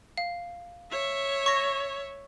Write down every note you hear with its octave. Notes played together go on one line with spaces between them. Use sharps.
F5
C#5 E5
C#6 A#6